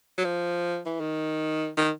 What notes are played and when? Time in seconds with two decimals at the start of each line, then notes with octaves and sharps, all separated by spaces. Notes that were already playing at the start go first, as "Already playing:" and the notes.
0.18 F#3
0.24 F3
0.86 E3
1.01 D#3
1.78 D#3